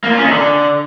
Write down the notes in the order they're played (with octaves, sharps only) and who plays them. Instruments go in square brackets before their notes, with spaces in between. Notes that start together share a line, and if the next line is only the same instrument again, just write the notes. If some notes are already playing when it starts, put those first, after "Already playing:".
[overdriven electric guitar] A#3
F4
C#4
D#3
D3